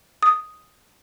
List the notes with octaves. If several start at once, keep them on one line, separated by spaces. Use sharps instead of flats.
D#6